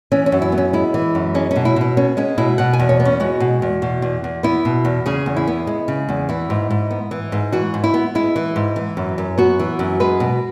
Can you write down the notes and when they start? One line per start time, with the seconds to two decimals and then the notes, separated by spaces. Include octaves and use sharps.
0.12 E3 C#4
0.26 C#4
0.32 F#2
0.42 E4
0.52 B3
0.58 C#4
0.73 G#3 E4
0.94 E3
1.15 F#2
1.35 G#3 C#4
1.51 B2 C#4
1.65 E4
1.76 B2 E4
1.97 B3 C#4
2.17 G#3 C#4
2.38 B2 E4
2.58 B2 F#5
2.73 G#5
2.79 E2
2.89 C#5
3.00 B3
3.05 C#4
3.20 G#3 F#4
3.40 B2
3.62 E2
3.82 B2
4.02 E2
4.24 E2
4.43 B3 E4
4.65 B2
4.85 E2
5.06 C#3 G#4
5.26 E2
5.37 E4
5.47 B3
5.67 G#3
5.88 C#3
6.09 E2
6.29 E3 E4
6.50 G#2
6.70 G#2
6.91 B3
7.11 E3
7.32 G#2
7.52 E3 F#4
7.74 G#2
7.84 E4
7.94 B3
8.15 G#3 E4
8.36 E3
8.56 G#2
8.76 E3
8.97 F#2
9.18 F#2
9.38 B3 F#4
9.59 E3
9.79 F#2
10.00 G#3 B4
10.20 B2